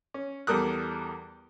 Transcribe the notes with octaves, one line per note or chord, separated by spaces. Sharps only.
C#4
E2 G3 A4 A#4 D#6 F#6